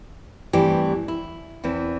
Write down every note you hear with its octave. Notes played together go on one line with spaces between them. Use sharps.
G2 E3 A3 C4 G4
E4
E2 E3 C4